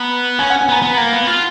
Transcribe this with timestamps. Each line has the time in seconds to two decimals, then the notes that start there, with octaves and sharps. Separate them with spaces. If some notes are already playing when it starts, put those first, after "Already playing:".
Already playing: B3 A#5
0.39 C#4 G#5
0.50 F#5
0.61 G#5
0.69 B3 A#5
0.82 B3 A#5
0.98 A#3
1.13 B3
1.27 F4